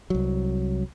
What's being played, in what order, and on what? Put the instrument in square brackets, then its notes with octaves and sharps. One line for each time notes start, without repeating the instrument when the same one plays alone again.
[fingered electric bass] C2 F#3